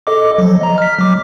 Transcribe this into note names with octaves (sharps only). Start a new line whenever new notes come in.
A4 D#5 D6
F3 F#3
D#5 A#5
F6 B6
F#3 D6